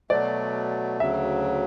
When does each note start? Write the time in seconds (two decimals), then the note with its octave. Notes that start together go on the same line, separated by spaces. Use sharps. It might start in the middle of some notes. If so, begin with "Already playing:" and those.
0.10 B2 F#3 A3 D5
1.00 D2 C#3 F#3 E5